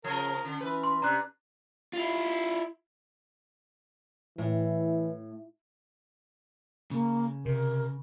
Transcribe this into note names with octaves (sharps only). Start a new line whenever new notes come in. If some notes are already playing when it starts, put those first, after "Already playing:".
C#3 F3 A#4
D3 C#4
E3 B4
C6
C3 D4 A#5 F#6
E4 F4
A2 E3
C#3 A#3
C3 A#4